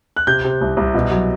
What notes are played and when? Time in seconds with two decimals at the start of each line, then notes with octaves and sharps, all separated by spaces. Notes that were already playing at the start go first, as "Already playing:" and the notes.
0.16 F#6
0.27 C3 G6
0.44 C3
0.61 C2
0.77 C2
0.94 B2
1.11 F#3